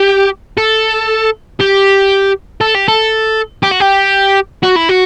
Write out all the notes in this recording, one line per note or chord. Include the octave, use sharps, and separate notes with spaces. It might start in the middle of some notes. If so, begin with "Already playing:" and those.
Already playing: G4
A4
G4
A4
G4
A4
G4
F#4
G4
F#4
E4
F#4